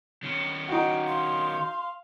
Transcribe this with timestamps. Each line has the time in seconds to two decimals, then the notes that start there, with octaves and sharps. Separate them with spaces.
0.23 D#3 C#4
0.69 D#4 F#4 G5
1.07 F5 C6